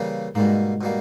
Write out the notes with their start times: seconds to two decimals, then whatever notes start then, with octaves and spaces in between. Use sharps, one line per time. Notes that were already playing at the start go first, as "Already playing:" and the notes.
Already playing: C#3 E3 G3 A#3
0.35 G#2 B2 G3 A#3
0.81 B2 G3 A#3